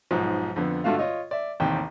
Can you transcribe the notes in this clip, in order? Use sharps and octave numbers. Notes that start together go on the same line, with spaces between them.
B1 G#2 F3
F2 D3 B3
G2 D3 A3 F4 F#4 F5
F4 C#5 D#5
D5 E5
A1 D#2 C3 G5